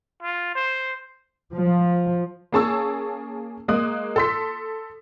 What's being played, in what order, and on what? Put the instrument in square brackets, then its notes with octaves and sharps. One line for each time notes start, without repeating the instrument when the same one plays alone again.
[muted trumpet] F4
C5
[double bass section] F3
[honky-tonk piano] A#3 C#4 G#4 A5 C#6 E6
G#3 A#3 D#6 F#6
A4 C6 B6